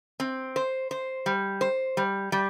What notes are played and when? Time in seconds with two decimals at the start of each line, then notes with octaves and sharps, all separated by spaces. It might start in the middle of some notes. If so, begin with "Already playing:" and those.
0.20 C4
0.56 C5
0.91 C5
1.26 G3
1.61 C5
1.97 G3
2.32 G3